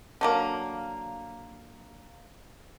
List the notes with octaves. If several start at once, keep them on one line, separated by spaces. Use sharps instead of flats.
D3 F#3 A#3